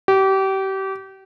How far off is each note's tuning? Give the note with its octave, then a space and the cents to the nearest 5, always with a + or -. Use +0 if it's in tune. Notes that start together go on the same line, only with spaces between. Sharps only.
G4 -30